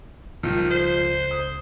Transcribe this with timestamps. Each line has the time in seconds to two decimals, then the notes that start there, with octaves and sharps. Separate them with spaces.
0.43 C#2 D#3 F3 G3
0.70 C5
1.31 D#6